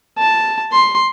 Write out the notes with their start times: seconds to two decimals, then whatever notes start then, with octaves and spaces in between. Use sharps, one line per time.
0.18 A5
0.72 C6